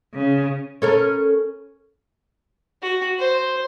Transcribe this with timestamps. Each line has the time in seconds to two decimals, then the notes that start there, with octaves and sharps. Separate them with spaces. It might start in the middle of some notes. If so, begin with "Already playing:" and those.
0.14 C#3
0.82 C#4 A4 A#4
2.82 F#4
3.19 C5